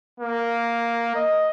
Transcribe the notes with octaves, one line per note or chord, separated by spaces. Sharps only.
A#3
D#5